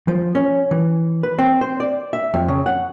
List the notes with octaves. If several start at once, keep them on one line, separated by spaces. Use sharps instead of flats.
F3
C#4
E3
B4
C4
C5
D5
E5
F2
C#3
F#5